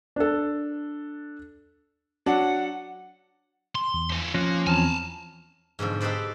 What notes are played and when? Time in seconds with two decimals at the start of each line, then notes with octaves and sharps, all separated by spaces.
0.16 D4 A4
2.26 F#3 D4 F#5
3.75 C6
3.94 E2
4.10 F3 B4
4.34 F3 A#3 C#4 F#6 A#6
4.67 E2 C4 G#5 A5 F6
5.79 G#2 B2 D3 F3
6.00 D#4 G4 A4 B4 C5 D5